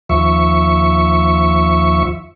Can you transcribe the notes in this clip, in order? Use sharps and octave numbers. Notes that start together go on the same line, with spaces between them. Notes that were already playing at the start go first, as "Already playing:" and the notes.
D#2 F3 E5 C#6